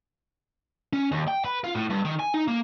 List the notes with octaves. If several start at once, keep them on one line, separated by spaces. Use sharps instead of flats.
C#4
D#2
G5
B4
F4
A2
G2
D#3
G#5
D#4
A#3